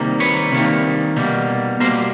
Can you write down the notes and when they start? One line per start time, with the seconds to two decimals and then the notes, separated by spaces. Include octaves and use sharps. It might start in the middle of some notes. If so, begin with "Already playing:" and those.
Already playing: C3 D#3 G3 A#3
0.20 B4 C#5
0.52 C3 D#3 G3 A#3
1.17 B2 G3 A#3
1.80 B2 G3 A#3 A#4 C5